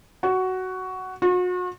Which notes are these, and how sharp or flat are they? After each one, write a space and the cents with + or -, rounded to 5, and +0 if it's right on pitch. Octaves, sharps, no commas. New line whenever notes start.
F#4 +10
F#4 -40